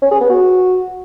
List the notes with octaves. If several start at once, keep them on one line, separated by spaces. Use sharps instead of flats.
C#4
G#4
B3
F#4